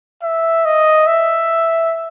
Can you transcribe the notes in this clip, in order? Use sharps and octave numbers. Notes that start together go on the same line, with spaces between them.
E5
D#5
E5